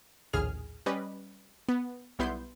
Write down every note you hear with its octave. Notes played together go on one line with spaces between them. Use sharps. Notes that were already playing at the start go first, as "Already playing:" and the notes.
A#1 D#2 A2 G#4 F6
G3 C#4 B4 D5 D#5
B3
B1 G3 B3 E4 C6 G6